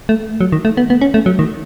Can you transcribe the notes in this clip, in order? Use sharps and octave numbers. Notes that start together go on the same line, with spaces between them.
A3
F#3
D#3
A3
B3
B3
C#4
A3
F#3
D#3